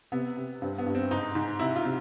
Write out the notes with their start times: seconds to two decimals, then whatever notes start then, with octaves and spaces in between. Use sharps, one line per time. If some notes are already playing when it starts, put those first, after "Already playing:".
0.12 C3 B3
0.37 C3
0.62 G2 C4
0.78 B3
0.86 G2
0.95 C4
1.11 G#2 D#4
1.35 G#2
1.59 C3 E4
1.76 F4
1.85 C3